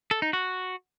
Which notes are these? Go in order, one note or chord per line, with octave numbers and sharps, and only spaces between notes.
A4
D#4
F#4